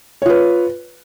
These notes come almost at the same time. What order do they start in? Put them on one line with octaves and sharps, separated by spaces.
C#5 F4 B4